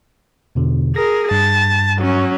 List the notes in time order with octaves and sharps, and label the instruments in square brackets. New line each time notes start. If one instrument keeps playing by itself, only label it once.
[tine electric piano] E2 B2 D3
[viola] G#4 A#4 [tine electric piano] A#6
[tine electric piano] G2 [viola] A5
[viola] F#3 C#4